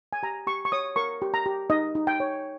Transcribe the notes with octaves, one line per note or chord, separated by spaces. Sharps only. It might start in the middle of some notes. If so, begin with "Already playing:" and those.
G#5
G4 A#5
G4 C#6
C#6
C#5 D#6
A#4 C#6
G4
A#5
G4
D#4 D#5
D#4
G5
C#5